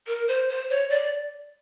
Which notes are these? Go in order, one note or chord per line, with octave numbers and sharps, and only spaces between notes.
A#4
C5
C5
C#5
D5